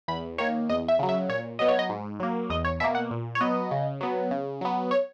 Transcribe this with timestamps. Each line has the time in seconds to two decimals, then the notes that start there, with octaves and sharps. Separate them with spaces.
0.08 E2 B5
0.38 D#3 A#3 C#5
0.69 E2 D#5
0.88 E5
0.99 C#3 F#3
1.09 E5
1.29 A#2 C#5
1.59 F#3 B3 D#5
1.68 C#5
1.79 D#5
1.89 G#2
2.20 F#3 A#3
2.50 E2 D#5
2.65 C#5
2.80 B2 A#3 E5
2.95 F#5
3.11 A#2
3.35 C#5
3.41 F#3 B3 D#5
3.71 C#3
4.01 F#3 B3
4.31 C#3
4.61 F#3 B3
4.91 C#5